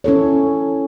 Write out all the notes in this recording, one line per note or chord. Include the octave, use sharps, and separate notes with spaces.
C#4 E4 A4 C#5